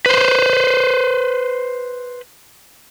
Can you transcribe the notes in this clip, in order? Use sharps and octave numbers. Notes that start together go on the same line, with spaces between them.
B4 C5